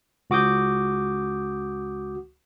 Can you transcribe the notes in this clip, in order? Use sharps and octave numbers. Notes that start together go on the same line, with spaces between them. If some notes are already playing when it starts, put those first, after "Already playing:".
C#2 F#4 D6 D#6 G6